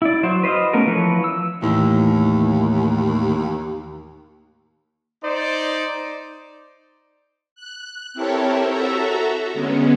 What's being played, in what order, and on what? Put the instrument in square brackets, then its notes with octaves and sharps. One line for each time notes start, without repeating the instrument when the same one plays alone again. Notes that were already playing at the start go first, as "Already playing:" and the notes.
[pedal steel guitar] E4 D5
F#3 C5
B4 C5 D#5 F5
A3 B3 C#4 A#4
E3 F3 B4 C#5
E6
[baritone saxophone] D#2 [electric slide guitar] A2 E3
[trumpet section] D#4 C5 D5
[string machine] F#6
C4 E4 G4 A4 A#4 C#5
F#4 A4 E5 A#5
D3 G#3 B3 C#4